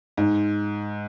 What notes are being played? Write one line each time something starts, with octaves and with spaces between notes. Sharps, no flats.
G#2